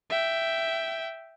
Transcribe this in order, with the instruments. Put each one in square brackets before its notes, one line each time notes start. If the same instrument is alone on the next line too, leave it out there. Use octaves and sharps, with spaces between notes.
[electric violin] E5 G5